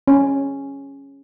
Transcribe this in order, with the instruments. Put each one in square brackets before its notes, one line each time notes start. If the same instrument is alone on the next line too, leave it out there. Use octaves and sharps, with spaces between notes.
[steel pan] C#4